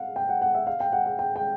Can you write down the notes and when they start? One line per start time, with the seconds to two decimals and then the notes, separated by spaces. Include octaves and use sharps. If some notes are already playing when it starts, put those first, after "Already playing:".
Already playing: F5 F#5
0.16 G5
0.29 F#5
0.42 F#5
0.55 E5
0.67 F5
0.80 G5
0.92 F#5
1.06 G5
1.19 G5
1.36 G5